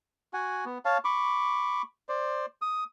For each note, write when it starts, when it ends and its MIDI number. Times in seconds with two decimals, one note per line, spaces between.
0.33 0.65 66
0.33 0.65 78
0.33 0.65 80
0.65 0.78 59
0.85 0.98 73
0.85 0.98 77
0.85 0.98 81
1.05 1.82 83
1.05 1.82 85
1.05 1.82 86
2.09 2.46 72
2.09 2.46 74
2.62 2.84 87